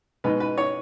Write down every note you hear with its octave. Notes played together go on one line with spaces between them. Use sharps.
B2 G#3 D#4 B4
B4
C#5